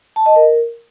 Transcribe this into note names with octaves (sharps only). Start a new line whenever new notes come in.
A5
D#5
A#4